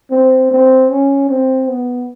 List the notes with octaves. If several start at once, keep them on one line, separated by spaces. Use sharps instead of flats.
C4
C4
C#4
C4
B3